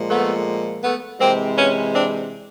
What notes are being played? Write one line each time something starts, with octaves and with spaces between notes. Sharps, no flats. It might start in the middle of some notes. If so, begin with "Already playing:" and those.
Already playing: A#2 F3 G#3
A3 B3
A3 B3
C3 E3 G#3 A#3 C4
B3 C#4
C4 D4